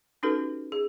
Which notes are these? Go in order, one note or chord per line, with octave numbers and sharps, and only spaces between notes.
C#4 D#4 F#4 G4 A4 B4
G#4